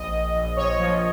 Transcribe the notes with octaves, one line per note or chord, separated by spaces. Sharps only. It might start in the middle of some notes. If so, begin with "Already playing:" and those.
Already playing: A#1 D#5
A#1
A#1
A#1 C#5
F3